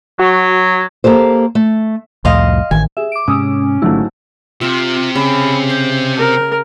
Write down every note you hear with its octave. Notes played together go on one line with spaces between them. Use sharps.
F#3 F#4
A#3 G4 A4 C5
A3
C2 F2 A2 D#5 F5 C6
A1 D#3 G#5
G#4 E5
D6 D7
G#2 C3 G#3 C#4 D#6 E6
G#1 G#2 D3 F#3 A3 D4 E4 F4
C3 F4 E5
C#3 B5
C5
A#4